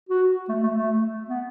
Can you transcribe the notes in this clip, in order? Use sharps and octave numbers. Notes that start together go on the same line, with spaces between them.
F#4
A3
A3
A3
B3